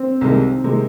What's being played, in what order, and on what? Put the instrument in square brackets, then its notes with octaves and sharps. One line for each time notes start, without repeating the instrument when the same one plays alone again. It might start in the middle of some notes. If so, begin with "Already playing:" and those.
Already playing: [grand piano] C4
[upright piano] C2 C3 D#3 G#3
C3 D#3 G#3